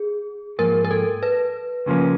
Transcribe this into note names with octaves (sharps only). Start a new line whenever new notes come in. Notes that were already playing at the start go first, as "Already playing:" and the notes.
Already playing: G#4
G#2 F3 A#3 A#4
A#4
A4
B4
C#2 C#3 F3 A#3 C#4